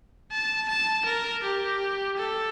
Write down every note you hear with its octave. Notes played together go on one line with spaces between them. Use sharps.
A5
A5
A#4
G4
A4